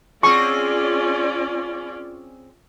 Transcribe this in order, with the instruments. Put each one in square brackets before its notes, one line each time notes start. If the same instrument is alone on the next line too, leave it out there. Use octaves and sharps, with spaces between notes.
[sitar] C4 G#4 [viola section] C#4 F4 D5 [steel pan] C#6